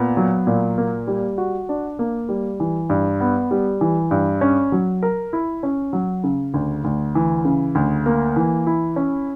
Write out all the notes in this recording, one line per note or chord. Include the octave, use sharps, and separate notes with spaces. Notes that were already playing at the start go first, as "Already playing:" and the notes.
Already playing: A#2 B3
F#3
A#2
A#3
G3
F#4
D4
A#3
G3
E3
G2
B3
G3
E3
G2
C#4
F#3
A#4
E4
C#4
F#3
C#3
D2
D2
E3
C#3
D2
A#3
E3
E4
C#4